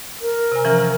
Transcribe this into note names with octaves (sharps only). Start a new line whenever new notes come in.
A#4
C3 G#5
E3 F3 C#4